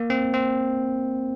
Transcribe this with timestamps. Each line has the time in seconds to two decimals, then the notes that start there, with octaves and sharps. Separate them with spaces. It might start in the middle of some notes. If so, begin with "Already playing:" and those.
Already playing: A#3
0.10 C4
0.34 C4